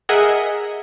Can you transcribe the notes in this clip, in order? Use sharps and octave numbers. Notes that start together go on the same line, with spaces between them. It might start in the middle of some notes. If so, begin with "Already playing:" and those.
G#4 A#4 D#5 E5 F#5 G#5